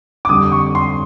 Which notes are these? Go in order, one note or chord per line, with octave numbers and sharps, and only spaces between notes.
D6
F2 D3 G3 D#6
C#6
C6